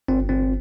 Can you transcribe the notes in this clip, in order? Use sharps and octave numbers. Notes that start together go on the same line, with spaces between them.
G1 C4
G1 C4